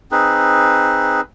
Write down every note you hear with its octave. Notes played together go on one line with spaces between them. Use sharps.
C4 D#4 G#4 B4